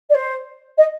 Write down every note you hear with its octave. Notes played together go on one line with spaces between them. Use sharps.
D5
C5
D#5